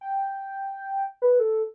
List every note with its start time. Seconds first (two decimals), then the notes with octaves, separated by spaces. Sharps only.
0.01 G5
1.22 B4
1.39 A4